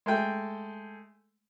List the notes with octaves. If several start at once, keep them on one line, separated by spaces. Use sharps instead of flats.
G#3 A3 G5